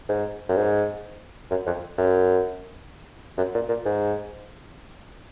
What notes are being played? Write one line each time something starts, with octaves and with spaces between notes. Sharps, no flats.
G#2
F#2
G#2
F#2
F2
F#2
F#2
A#2
A#2
G#2